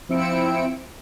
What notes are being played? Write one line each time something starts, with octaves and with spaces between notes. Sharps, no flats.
F3 C4 E4 E6 C#7 D7